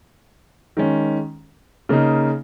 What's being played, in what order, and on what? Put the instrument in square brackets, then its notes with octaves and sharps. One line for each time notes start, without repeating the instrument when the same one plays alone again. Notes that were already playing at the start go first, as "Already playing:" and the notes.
[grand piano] D#3 G#3 C#4
C#3 A#3 D#4